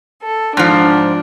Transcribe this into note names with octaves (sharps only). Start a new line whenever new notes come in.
A4
G#2 F3 D4